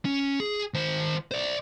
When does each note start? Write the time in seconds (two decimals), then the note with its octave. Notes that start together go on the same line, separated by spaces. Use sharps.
0.05 C#4
0.40 G#4
0.74 D#3 C5
1.31 C5 D5